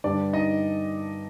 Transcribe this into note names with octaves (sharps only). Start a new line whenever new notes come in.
G2 D3 G3 D4 D5
D#4 D#5